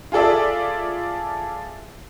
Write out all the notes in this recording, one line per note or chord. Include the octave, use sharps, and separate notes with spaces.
F4 G#4 A4 D5 E5